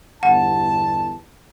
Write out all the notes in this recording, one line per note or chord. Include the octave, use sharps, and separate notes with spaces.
G1 E2 F#5 A5